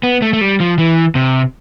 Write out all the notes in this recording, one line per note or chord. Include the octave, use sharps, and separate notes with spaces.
B3
A3
A3
G3
F3
E3
C3